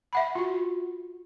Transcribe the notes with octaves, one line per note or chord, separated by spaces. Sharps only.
E5 F#5 B5
F4 F#4